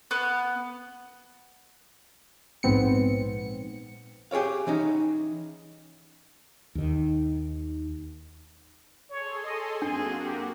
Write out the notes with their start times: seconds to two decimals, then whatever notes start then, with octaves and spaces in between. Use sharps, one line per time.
0.11 B3
2.63 A#1 G#2 B3 C4 C#7
4.31 G4 G#4 A#4 C#5 F5
4.67 E3 C#4 D#4
6.75 D#2 D#3
9.10 G#4 A4 C#5 C6
9.44 D#5
9.82 F#2 A#3 C4 D4 F#4 G#4 G#5
10.23 G4